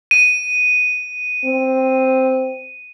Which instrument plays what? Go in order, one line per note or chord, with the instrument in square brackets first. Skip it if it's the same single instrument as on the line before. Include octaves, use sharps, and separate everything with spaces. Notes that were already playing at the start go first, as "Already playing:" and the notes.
[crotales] D#7
[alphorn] C4